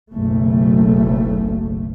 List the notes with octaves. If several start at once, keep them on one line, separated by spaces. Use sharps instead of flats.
F#1 B1 A3